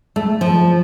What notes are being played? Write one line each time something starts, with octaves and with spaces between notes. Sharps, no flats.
A3
F3